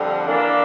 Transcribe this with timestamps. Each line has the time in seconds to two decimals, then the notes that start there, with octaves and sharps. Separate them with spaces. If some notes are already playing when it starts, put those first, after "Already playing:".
Already playing: F2 D3 G3
0.26 E3 A#3 D4